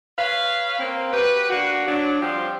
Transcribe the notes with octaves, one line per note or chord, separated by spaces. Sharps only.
B4 C#5 F5
A#3 C4
F#4 G4 B4
A#3 D4 F#4
F#3 D4
F3 G3 C4 F4 G4